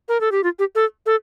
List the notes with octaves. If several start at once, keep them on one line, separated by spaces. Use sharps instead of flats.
A#4
A4
G4
F4
G4
A4
A4